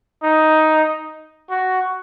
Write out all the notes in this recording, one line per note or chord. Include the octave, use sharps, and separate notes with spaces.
D#4
F#4